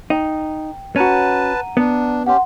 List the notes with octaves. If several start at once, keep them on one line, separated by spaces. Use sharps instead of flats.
D#4 G5
C#4 F#4 B4 F#5 A5 A#5 D#7
B3 D4
C#4 G4 F#5 C6